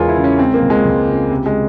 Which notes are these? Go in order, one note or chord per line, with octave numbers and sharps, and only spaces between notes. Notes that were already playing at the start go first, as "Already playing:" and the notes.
Already playing: E2 C#3 G#3 F4 G#4 A#4 C#5
E4
C#3
C#4
G#3 C4
A#3
C#2
G#3
C#2
C#3
C3
G#3